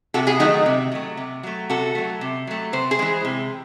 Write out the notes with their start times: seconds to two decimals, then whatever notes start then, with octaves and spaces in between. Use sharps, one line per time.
0.14 C3 F#4 A4
0.27 E4 G#4
0.40 D#3 F#3 A3 D#4 F#4
0.66 C3
0.92 F#3 A3
1.17 C3
1.43 F#3 A3
1.69 C3 F#4 A4
1.95 F#3 A3
2.21 C3
2.47 F#3 A3
2.73 C3 C5
2.91 G#4 C5
2.99 E3 G#3
3.25 C3